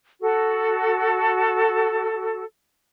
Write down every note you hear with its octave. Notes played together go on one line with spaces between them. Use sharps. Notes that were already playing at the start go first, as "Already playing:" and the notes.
F#4 A4